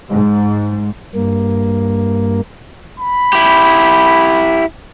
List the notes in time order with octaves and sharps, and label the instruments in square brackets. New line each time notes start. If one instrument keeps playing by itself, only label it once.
[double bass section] G#2
[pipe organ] G2 A#3
[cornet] B5
[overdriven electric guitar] E4 G4